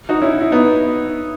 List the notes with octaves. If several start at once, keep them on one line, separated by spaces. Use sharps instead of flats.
D#4 F#4
C#4 E4
E4
B3 D#4